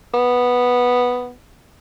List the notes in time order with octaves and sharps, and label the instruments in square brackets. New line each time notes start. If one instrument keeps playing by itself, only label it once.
[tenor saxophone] B3